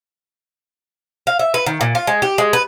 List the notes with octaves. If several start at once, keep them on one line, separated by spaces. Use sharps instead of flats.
F5
E5
B4
D#3
A#2
F4
G#3
G4
G#3
B4